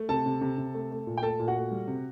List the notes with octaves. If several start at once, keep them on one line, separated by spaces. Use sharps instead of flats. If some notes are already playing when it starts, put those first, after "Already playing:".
Already playing: A3
C3 A4 A5
C3
C3
C3
A3
A3
A#2
G5
A3 A4 A5
A#2
F#4 F#5
A3
G3
C3